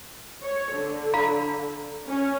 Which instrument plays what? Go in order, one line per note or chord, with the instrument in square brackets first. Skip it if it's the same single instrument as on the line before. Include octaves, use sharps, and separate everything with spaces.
[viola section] C#5
D3
[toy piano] F5 A#5 B5
[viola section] C#4